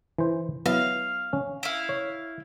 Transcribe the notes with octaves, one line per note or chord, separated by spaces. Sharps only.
E3 C5
F#3 B3 E4 F5
C#4
E4 F5
C#5